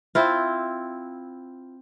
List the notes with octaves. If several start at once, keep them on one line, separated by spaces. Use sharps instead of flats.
C4 E4 F4